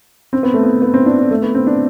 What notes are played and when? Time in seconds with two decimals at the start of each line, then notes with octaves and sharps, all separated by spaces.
0.33 C4
0.43 B3
0.54 A3
0.63 B3
0.82 B3
0.94 C4
1.06 D4
1.18 D4
1.31 A3
1.42 B3
1.54 C4
1.67 D4